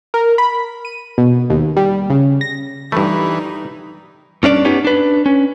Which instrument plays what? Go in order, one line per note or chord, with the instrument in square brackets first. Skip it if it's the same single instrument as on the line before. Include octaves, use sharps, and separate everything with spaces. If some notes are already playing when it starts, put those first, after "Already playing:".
[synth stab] A#4
B5
D#7
B2
D#2
G3
C#3
A#6
[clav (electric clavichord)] G2 A3 [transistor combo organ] E3 B4 [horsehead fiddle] G3 D#4
[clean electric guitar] G2 C#4 D4 D5
B3 C#4 D#4 G4
D4 B4
C#4